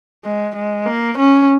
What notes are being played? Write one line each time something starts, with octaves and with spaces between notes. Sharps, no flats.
G#3
G#3
A#3
C#4